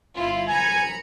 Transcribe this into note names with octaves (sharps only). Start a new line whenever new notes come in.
G1 E4 F4
G#5 A#5 B5 C#7